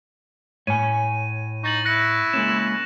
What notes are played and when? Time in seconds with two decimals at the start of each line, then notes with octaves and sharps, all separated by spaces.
0.67 A2 C#5 G#5 D#7
1.64 D#4 C#6 A6 F#7
1.85 E4 F#6 A#6 C#7
2.34 G#3 A#3 C#4 E7